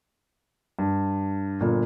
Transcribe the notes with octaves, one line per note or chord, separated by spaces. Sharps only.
G2
G1 A#2